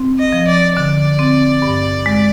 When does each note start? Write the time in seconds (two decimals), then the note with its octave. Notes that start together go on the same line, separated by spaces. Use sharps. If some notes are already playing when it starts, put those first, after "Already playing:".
Already playing: C4
0.19 D#5
0.32 F3
0.48 D5
0.76 D3 D5
1.19 C4
1.62 G2
2.06 G#3